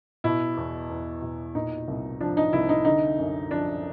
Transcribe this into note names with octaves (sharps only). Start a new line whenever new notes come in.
B2 E4
E2
E2
B2
A#2 D#4
C2
F3 D4
D#4
C2 E4
D#4
D3 D#4
F#2
F3 D4